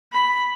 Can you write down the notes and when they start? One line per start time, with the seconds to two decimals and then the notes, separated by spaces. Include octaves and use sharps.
0.12 B5